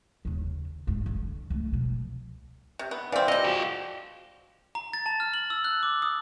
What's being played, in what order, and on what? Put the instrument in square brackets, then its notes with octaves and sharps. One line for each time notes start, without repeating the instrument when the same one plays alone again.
[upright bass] D#2 C#3
G#1 F2
D3
C#2 A3
B2 F3
[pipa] C3
B3
[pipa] E3 C4 [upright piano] D5 F5
[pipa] F3 G3 [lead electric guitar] D#5
[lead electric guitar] F#4 G5
[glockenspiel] A#5
A6
A5
F6
F#7
E6
F#6
D6
D#6